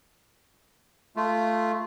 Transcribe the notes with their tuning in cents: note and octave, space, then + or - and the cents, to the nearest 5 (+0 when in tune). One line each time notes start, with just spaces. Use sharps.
A3 +0 F4 -10